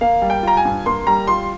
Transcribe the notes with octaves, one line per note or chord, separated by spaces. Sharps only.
A#3 F5
G3
G5
F4 A#5
G#5
G2
A#3 C6
G3 A#5
F4 C6